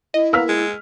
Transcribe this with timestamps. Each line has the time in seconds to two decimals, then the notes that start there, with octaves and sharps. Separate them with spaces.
0.14 E4 D#5
0.33 A#3 B3 E6 F6 B6
0.49 G#3